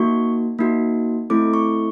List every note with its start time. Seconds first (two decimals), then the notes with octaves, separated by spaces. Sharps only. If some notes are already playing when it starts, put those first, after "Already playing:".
Already playing: A#3 D#4 F#4 C#6
0.59 A#3 D#4 F#4
1.30 A3 C4 E4 A4 D6
1.54 C#6